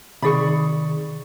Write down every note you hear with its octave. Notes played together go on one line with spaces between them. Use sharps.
C3 D#3 G#4 D5 B5 C#6